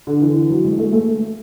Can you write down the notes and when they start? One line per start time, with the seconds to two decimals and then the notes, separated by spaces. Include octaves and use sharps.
0.07 D3
0.22 E3
0.36 E3
0.50 F#3
0.65 G#3
0.79 A3
0.93 A3